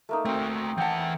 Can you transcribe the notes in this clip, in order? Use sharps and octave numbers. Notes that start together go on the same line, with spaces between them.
A3 A#3 D#4
A3 C4 F#4
E3 F#5 G5 A5